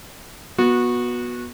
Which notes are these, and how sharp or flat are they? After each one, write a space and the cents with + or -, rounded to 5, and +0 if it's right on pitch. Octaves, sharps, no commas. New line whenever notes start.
B3 -20 F#4 -20